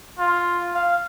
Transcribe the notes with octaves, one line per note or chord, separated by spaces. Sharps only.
F4
F5